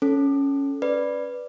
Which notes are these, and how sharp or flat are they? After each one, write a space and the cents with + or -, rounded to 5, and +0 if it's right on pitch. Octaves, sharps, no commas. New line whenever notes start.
C#4 +0 A4 +0
B4 +0 D5 +0